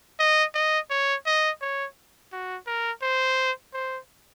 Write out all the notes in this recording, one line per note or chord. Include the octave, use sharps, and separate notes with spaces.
D#5
D#5
C#5
D#5
C#5
F#4
A#4
C5
C5